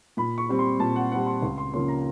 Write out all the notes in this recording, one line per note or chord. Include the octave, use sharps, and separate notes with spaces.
A#2 B5
C#6
G3 C4
C6
A#2 A5
F#5
G3 C4 F#5
C6
C#2 C6
C6
C#3 F3 A#3 C#4 C6
A#5